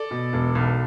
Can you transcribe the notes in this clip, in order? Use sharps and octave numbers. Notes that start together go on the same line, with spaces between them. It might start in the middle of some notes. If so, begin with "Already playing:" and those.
Already playing: A4 D5
B2
E1
B1